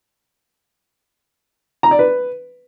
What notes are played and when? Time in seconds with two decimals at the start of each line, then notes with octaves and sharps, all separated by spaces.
1.83 A#5
1.91 D5
1.99 B4